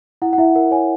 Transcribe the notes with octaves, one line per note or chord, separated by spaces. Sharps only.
E4 F#5
F#5
E4 E5
A#4 F#5
C#5 G#5